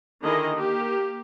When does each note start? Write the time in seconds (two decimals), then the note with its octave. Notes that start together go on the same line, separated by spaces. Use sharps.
0.23 D3 D#3 E4 G#4 D#5
0.52 A#3 G4